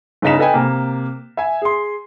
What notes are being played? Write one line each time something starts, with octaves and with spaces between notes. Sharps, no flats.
G1 C#3 D#4 B6 E7
A4 B4 D#5 G5 G#5
C3 A#3
E5 G#5
G#4 C6